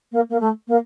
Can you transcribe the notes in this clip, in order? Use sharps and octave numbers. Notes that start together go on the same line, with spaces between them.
A#3
A#3
A3
A#3